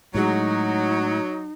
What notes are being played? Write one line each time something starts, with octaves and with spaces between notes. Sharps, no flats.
A2 F#3 G#3 D#4